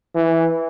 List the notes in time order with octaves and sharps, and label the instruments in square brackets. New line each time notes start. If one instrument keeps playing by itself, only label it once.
[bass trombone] E3